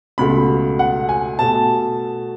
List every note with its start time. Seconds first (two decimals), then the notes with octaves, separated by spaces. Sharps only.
0.18 C#2 B2 A3 B5
0.79 F#5
1.09 G#5
1.39 B2 A3 A5